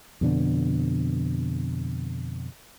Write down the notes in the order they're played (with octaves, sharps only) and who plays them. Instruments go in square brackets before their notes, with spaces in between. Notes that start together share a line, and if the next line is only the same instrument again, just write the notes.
[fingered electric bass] F2 B2 D3